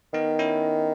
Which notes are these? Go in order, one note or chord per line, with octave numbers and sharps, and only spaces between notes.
D#3 B3 D#4
C#4 E4